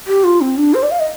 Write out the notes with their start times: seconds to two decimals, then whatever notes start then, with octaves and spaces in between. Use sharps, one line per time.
0.07 G4
0.24 F4
0.41 C4
0.57 D4
0.74 C5
0.83 D5
0.91 F5
1.00 D#5